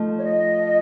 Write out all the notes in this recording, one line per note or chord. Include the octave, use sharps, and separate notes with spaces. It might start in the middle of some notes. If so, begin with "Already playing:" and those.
Already playing: F3 A3 D#4
C#5
D#5